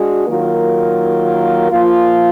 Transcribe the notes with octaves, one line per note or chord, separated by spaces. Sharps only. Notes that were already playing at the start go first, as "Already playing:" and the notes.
Already playing: G#3 D4 F#4
D#3 F#3 A#3 F4 A#4
F3 A#3 F4